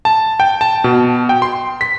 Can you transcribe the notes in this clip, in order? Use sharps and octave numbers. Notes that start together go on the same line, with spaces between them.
A5
G5
A5
B2
G5
C6
B6